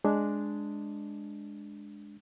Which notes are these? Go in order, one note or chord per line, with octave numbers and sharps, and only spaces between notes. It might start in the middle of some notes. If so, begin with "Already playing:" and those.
G#3 D4